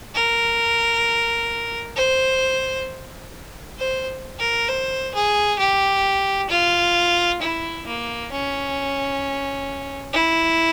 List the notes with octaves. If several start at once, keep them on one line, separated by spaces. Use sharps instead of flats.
A#4
C5
C5
A#4
C5
G#4
G4
F4
E4
A#3
C#4
E4